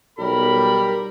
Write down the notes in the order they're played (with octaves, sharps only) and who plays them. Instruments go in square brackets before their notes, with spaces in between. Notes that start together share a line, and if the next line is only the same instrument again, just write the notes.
[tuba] B1 [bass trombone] G3 [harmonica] A#4 [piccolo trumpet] B5